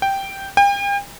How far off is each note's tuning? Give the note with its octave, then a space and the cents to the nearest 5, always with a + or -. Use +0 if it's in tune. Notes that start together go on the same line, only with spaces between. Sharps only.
G5 -5
G5 +40